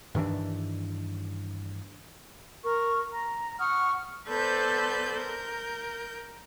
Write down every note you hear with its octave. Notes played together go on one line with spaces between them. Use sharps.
G2 D#3 E3 D4
A#4 C#6
A#5
F#5 C#6 D#6 F6
B3 A4 B4 C5 D5 G6
A#4 G6